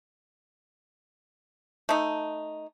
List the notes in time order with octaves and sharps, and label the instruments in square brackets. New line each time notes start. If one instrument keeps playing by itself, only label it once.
[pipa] A3 D#4